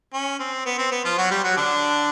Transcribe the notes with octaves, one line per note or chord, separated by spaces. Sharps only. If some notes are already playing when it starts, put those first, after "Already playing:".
C#4
C4
B3
C4
B3
F3 F4
F#3 F#4
G3 G4
F#3 F#4
D3 D4